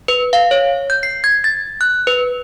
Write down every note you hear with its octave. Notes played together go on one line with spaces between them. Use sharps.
B4
F5
C#5
G6
C7
G#6
A6
F#6
B4